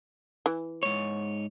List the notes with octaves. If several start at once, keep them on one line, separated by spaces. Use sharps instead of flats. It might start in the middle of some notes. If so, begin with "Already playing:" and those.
E3
G#2 C#5